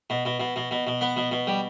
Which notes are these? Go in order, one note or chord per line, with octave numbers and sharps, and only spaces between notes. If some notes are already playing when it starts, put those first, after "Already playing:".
B2
B2
B2
B2
B2
B2
B3
B2
B2
G3